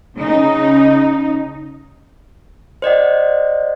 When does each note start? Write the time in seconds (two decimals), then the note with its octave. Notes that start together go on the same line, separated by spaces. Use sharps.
0.19 C#3 D#4
2.82 C5 D5 D#5 F#5